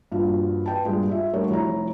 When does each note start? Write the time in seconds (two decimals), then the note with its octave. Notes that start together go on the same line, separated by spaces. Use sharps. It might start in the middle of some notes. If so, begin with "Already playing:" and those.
0.12 G2 A#2 F3 F#4
0.66 B4 G5 A5
0.85 G2 A#2 G3 G#3
1.09 F4 E5
1.33 G3 A3 D4 F#4 A#4 C#5
1.50 F1 E4 C#5 A#5